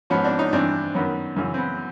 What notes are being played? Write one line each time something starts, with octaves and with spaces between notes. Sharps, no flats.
G#2 F3 B3 C#4
C4 D4
C#4 D#4
G2 E3 C4 D4
F#2 D#3 B3 C#4
F#2 C#3 E3
C4
B3